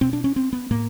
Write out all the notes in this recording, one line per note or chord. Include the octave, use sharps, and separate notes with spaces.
B2 C4
D4
C#4
C4
B3
A2 A#3